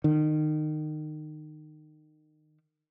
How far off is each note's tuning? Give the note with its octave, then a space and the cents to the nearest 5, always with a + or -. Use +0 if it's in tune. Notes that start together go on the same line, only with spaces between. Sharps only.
D#3 -25